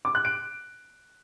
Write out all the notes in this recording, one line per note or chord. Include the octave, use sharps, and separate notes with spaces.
D6
F#6
D7